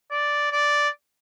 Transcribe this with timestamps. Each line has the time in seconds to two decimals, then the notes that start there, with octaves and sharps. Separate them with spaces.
0.11 D5
0.52 D5